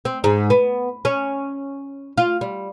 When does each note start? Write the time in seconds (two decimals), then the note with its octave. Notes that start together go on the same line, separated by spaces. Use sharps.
0.05 C4
0.24 G#2
0.50 B3
1.05 C#4
2.18 F4
2.41 G3